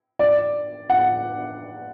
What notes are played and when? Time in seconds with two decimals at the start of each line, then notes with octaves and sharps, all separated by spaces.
0.19 D5
0.90 F#5